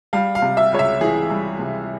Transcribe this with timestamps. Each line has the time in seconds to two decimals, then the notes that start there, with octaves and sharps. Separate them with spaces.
0.13 G3 F5
0.35 F5
0.42 C3
0.57 E5
0.72 C#2 C#5
0.79 E5
1.01 E3 G#4
1.30 G3
1.59 C3